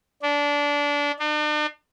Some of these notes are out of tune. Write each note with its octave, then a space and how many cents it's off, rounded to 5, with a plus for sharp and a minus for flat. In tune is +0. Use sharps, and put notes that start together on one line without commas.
D4 -20
D4 +45